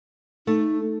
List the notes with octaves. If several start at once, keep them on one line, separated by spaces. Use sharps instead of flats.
A3 D#4